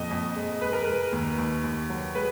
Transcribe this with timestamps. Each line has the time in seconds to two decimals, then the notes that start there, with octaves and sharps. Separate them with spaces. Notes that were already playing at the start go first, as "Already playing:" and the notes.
Already playing: F2 A#2 D#5
0.11 F2
0.36 G#3
0.61 G#3 B4
0.73 A#4
0.85 G#3 B4
1.12 D#2
1.38 D#2
1.64 D#2
1.90 F#3
2.15 G#3 B4